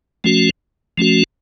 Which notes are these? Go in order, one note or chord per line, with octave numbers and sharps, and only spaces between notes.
F3 A3 C#4 F#4
F3 A3 C#4 F#4